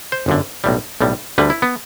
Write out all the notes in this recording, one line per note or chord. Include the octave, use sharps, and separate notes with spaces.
C5
G1 F#2 D3
B1 A2 G3
B1 A2 G3
D2 D3 G3 B4
E4
B3